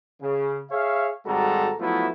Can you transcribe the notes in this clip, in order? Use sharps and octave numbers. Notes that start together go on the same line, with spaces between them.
C#3
G#4 C#5 E5 F5
G#1 G3 G#3 F#4 A4 A#5
F3 F#3 A3 B3 E4 F4